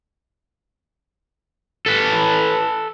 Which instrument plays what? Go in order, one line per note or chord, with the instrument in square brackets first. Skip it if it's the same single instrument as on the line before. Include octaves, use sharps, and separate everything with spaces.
[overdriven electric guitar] A4 B4